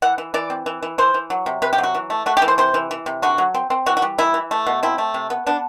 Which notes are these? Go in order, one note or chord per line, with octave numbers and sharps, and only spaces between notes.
E3 F#5
E3
E3 D5
C4
E3
E3
E3 C5
E3
F#3
C3
C3 B4
G4
F#3
F#4
E3
A3
A3 F#4
G4
E3
C5
C3 C5
E3
E3
C3
D3 F#4
F#3
C4
C4
E3 F#4
F#4
G3
E3 E4
E3
A3
B2
C4 E4
A3
C3
B3
B3 D4